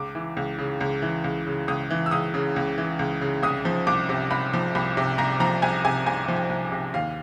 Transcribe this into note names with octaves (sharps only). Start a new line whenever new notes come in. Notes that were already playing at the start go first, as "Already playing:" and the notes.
Already playing: C#2 D6
E3
C#2
C#3
C#2
E3
C#2
C#3
C#2 D#6
E3
E6
C#2 D#6
C#3
C#2
E3
C#2
C#3
C2 D#6
F3
C2 D6
C3
C2 B5
F3
C2 B5
C3
C2 A#5
F3 A#5
C2 G#5
C3 G#5
C2 G#5
F3
G5
C2
C3
D#2 F5